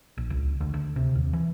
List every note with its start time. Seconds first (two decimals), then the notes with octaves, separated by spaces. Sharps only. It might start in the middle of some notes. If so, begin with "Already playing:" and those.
0.18 A#1
0.30 C#2
0.61 D2
0.74 D2
0.96 C3
1.15 D#2
1.33 E3